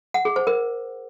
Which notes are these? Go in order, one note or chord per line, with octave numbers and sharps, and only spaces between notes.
F#5
G#4
C5
A#4